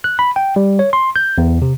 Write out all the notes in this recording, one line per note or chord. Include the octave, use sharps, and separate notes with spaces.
F#6
B5
G5
G3
C#5
C6
G6
E2
C3